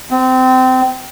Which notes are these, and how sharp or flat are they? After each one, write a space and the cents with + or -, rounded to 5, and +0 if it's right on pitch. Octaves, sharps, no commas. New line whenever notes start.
C4 -25